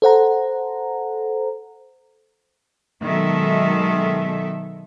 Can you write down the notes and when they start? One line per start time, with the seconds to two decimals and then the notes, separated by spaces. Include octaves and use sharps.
0.02 A4 C5 F#5 A#5
3.02 B2 D#3 F#3 G#3 A4 E5